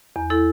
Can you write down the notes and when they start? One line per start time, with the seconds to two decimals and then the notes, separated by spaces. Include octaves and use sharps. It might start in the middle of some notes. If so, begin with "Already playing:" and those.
0.16 E2
0.30 E4 A4